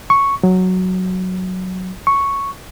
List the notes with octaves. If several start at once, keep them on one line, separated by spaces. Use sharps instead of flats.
C#6
F#3
C#6